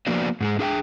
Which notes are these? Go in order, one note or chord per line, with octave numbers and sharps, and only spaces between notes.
F3 A#3 B3 D4 F#4 D5
G#2 G#3 G#4
D4 G#4 F5 G5